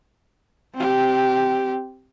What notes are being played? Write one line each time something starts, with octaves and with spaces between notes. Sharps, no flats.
C4 G4